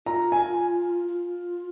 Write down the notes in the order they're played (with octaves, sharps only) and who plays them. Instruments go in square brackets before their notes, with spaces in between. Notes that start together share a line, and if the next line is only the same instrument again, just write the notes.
[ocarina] F4 [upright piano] A#5
[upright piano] G#5
[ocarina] F4